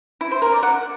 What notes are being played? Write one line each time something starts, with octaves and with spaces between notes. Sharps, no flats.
E4
C5
A#4
D5
F#5